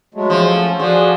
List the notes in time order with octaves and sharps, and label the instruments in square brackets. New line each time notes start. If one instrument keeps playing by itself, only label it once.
[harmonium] F#3 G#3 A3
[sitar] F3
[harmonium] C#4 A4
[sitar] F3 [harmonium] D4 F#4 G#4